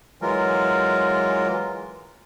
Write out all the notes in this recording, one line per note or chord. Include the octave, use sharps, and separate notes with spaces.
E3 F#3 G#3 F4 A#4